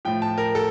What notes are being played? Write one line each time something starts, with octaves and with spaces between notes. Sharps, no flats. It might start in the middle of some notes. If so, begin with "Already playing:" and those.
A2 F3 G5
A5
A#4
A4